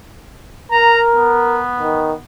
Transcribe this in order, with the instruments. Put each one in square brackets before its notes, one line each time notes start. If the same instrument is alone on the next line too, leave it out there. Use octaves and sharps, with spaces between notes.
[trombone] A#4 [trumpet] A#5
[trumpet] B3
[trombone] D#3